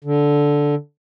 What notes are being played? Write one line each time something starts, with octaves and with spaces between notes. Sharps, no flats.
D3